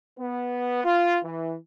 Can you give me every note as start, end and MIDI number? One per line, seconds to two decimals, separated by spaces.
0.19 0.80 59
0.84 1.18 65
1.25 1.56 52